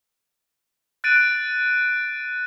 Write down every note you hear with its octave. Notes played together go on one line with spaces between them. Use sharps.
F#6 A6 D7 D#7